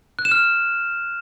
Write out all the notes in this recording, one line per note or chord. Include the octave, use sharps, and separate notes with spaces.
F#6
E7
F6